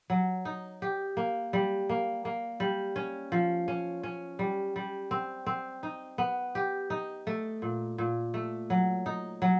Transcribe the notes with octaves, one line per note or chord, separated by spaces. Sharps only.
F#3
D#4
G4
A#3
G3
A#3
A#3
G3
C#4
F3
C#4
C#4
G3
G3
C4
C4
D#4
B3
G4
D#4
A3
A#2
A#2
A3
F#3
D#4
F#3